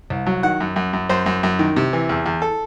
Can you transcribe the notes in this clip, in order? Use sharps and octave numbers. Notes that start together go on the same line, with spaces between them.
C2
F#3
D#3 F#5
F#2
F#2
F#2
F#2 C5
F#2
F#2
D#3
C3
E3
E2
E2
A4